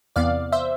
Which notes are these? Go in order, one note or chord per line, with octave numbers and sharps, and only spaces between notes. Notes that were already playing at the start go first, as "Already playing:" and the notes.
E2 C3 E3 B3 D5 F5
C5 E5